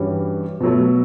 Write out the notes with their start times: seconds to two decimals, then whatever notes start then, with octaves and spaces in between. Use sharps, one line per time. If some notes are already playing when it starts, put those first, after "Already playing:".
Already playing: G2 E3 G3 C#4 F#4
0.60 B2 F#3 A3